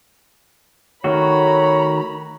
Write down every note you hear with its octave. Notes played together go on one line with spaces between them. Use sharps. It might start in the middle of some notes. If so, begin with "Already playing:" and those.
D#3 A3 F#4 C#5 A#5 B5